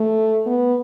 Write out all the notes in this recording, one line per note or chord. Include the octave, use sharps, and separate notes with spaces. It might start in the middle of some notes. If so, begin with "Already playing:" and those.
Already playing: A3
B3